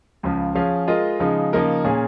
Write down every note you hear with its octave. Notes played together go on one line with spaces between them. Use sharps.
C#2 C#3 F3
F3 C#4 G#4 F5
G#3 F4 A#4 D#5
C#3 F3 G#3 D#4
C#3 F3 A#3 D#4 A#4
A#2 A#3 C#4 G#4